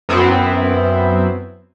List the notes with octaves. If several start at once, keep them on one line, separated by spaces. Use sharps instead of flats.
F#2 B3 C4 E4